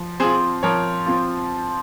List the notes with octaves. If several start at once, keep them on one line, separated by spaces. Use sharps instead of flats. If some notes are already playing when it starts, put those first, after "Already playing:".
Already playing: F3
C4 F4 G#4 C5
F3 A#4 C#5
C4 F4